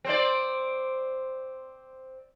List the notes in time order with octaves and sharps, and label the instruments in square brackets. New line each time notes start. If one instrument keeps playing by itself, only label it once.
[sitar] C4 C5 D5